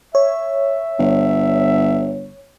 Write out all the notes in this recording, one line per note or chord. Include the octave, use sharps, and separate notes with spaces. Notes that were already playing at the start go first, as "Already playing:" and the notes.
C#5 E5
G1